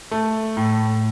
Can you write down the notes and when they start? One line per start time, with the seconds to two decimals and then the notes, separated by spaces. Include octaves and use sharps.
0.11 A3
0.57 A2